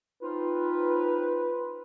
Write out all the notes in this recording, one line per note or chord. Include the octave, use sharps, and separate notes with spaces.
C4 D#4 F4 B4